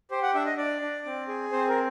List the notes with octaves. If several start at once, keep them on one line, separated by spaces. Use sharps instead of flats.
G4 C5
F#5
D4 E5
D#5
D4 D5
D4
C4
G#4
C4 C5
A#4